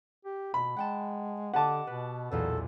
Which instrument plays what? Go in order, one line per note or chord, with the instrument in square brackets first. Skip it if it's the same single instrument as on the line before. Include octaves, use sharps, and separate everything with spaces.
[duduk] G4
[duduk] B2 [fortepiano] B5
[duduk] G#3 [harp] F#5 G5 A5
[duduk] D3 [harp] G4 D#5 D6 [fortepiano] F#5 A5
[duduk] B2 [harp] B4
[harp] B1 E2 A#2 [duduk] A4